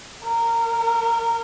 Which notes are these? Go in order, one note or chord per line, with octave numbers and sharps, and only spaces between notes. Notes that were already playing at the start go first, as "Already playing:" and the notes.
A#4